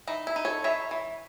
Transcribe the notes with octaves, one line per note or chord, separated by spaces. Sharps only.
E3 D#4
E4
D#4
A4 C#5
E3 C#5 E5
E3